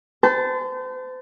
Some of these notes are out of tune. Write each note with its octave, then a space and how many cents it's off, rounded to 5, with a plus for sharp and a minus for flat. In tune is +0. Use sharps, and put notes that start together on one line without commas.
C5 -40 A5 +0